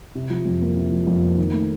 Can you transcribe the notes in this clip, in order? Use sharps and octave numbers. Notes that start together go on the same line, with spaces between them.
C3
F3
F2
A#3
C3
F3
F2
A#3
D#3
A3